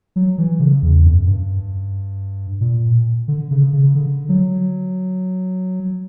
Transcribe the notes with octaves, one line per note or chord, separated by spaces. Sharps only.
F#3
E3
C#3
E2
F#2
G2
A#2
D3
C#3
C#3
D3
F#3